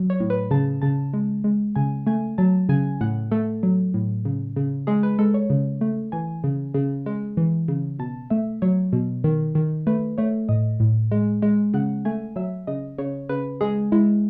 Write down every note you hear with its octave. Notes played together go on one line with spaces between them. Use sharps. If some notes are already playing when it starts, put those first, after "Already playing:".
Already playing: F#3
C#5
A2
B4
C#3 A5
C#3 A5
G#3
G#3
C#3 G#5
A3 G#5
F#3 A5
C#3 G#5
A2 F#5
A3 A4
F#3
A2
C#3
C#3
G#3 G#4
B4
G#3 A4
C#5
C#3
A3
E3 G#5
C#3
C#3
G#3
E3
C#3
B2 A5
A3 E5
F#3 C#5
B2
D#3
D#3
A3 B4
A3 C#5
A2 D#5
A2
G#3
G#3
C#3 F#5
A3 G#5
F#3 E5
C#3 D#5
C#3 C#5
C#3 B4
G#3 G#4
G#3 E4